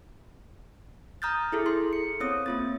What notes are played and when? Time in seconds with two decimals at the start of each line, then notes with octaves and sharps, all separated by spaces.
1.22 A#5 D#6 F6 G6 A6
1.52 E4 G#4 A4
1.66 E4 A4 C6
1.93 C#7
2.20 B3 C4 C#5 D#6
2.46 A#3 F4 A6